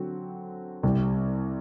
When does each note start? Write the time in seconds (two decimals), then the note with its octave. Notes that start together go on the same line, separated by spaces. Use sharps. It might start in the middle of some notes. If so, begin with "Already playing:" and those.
Already playing: D3 F#3 C4 F#4
0.83 C2 C3 G3